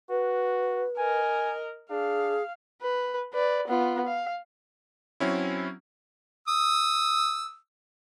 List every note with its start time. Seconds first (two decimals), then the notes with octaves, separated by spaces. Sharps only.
0.10 F#4 B4
0.98 A#4 D#5 G#5
1.90 D4 G#4 F5
2.82 B4
3.33 B4 D5
3.68 B3 F4
4.06 F5
5.20 F#3 C4 C#4 E4
6.48 D#6 E6